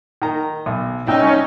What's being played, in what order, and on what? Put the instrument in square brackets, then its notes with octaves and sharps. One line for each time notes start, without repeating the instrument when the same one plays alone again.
[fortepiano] D#3 A#5
B1
[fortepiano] C2 G5 E6 [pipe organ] C#4 [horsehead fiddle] D#4